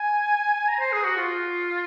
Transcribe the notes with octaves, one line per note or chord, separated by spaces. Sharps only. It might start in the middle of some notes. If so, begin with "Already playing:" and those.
Already playing: G#5
A#5
C5
G#4
F#4
F4